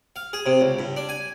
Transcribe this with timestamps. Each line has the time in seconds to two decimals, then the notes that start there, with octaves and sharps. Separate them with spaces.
0.16 F5
0.33 G#4
0.46 C3
0.61 C#2
0.79 G2
0.96 D4
1.09 G#5